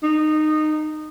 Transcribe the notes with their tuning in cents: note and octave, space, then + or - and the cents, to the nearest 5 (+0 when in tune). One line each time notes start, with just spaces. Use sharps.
D#4 -20